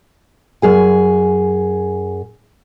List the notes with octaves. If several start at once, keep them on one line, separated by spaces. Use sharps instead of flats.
F#2 G#4 G#5